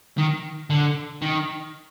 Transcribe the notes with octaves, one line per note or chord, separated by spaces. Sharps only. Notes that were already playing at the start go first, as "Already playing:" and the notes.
D#3
D3
D#3